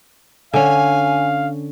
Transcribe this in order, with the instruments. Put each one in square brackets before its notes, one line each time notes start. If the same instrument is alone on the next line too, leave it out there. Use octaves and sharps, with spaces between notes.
[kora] D3 C#4 [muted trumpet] F5 [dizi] G#5